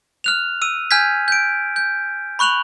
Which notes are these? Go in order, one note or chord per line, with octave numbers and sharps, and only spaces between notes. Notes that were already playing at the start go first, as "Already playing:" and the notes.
F6 F#6 F7
E6 D#7
G#5 F6 G6 G#6 B6
G6 D7
G6
B5 C#6 F#6 F7 F#7